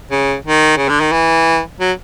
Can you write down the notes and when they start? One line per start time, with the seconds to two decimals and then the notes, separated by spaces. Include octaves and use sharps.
0.11 C#3
0.45 D#3
0.77 C#3
0.89 D3
1.00 D#3
1.12 E3
1.80 F#3